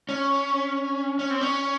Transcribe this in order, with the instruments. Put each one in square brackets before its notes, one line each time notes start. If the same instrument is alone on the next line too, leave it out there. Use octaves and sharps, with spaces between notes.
[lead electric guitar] C#4
C#4
C4
C#4